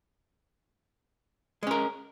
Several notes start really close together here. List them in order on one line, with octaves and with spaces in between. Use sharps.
G#3 C#4 A#4